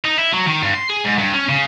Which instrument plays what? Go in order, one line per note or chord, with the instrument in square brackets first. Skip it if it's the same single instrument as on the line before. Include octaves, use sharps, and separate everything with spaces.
[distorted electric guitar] D#4
E4
F#3
D#3
G2
C6
G#4
G#2
G2
C#4
C#3